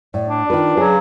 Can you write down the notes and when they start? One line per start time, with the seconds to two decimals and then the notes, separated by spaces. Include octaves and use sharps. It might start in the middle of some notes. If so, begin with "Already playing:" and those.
0.14 A2 D5
0.29 D4
0.50 D#3 F4 B4
0.77 C#3 F#3 G#4